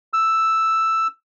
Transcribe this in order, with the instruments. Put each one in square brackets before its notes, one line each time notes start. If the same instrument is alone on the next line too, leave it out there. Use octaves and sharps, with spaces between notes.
[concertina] E6